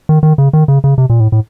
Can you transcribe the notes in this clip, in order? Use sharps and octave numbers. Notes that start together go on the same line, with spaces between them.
D#3
D#3
C#3
D#3
C#3
C#3
C3
A#2
A2
A2